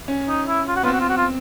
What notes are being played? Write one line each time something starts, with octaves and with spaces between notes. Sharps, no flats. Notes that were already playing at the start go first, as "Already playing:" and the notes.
C#4
D#4
E4
F4
F#4
B3 F4
C4 F#4
F4
F#4
F4